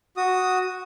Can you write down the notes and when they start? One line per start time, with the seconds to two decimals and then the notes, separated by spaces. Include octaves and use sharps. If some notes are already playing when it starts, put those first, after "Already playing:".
0.17 F#4 D#6